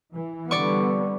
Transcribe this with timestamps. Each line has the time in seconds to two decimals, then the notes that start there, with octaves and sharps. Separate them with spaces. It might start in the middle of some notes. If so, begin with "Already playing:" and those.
0.14 E3
0.51 D3 G3 B3 D5 C#6